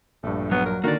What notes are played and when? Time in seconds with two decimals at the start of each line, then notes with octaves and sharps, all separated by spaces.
0.23 A#1 G2 A3
0.51 F#3 B3
0.65 A#4
0.84 D3 D#3 A#3 F#4 D5